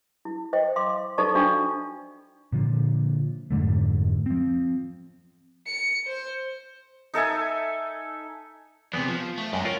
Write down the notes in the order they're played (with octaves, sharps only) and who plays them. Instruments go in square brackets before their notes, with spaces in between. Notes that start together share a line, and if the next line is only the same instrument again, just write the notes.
[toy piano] E4
C5 D#5 G5
F5 C6 D6
D#4 A4 C5 D5 A5 C#6
D4 F#4 F5 G5 B5 C#6
[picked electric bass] A#2 D3 F3
F2 G#2 D3 A3
F3 C4
[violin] C#7
C5
[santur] D#4 A4 E5 G#5
[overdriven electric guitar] E2 C3 [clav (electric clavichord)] B3
[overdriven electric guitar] F3
A3
[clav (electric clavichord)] F#2 [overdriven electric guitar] G#3 G4
[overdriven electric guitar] C#4 [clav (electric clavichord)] F4 A#4 F#5